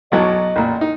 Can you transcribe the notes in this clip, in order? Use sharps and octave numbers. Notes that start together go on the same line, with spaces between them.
B1 F#3 D#5 A5
A1 A#2
D#4